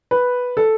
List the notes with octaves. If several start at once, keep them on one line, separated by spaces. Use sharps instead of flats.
B4
A4